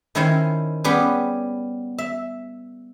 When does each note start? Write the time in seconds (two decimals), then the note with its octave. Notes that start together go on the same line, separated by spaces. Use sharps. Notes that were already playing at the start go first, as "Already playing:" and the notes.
0.15 D#3 C#4 E4 C5 C#5 G#5
0.84 G3 B3 C#4 G4 G#4 B4
1.98 E5